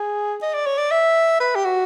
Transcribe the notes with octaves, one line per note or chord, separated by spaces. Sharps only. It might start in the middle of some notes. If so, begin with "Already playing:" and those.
Already playing: G#4
D#5
D5
C#5
D5
E5
B4
G4
F#4